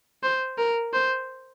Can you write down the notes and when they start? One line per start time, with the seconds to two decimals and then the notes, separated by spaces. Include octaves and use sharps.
0.23 C5
0.58 A#4
0.93 C5